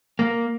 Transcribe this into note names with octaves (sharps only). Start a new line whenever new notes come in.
A#3